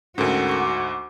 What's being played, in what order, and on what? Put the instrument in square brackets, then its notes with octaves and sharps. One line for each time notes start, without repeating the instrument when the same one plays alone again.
[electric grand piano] D2 G#2 [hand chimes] C#4 A4 A#4 [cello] F#4
[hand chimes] C#6 D6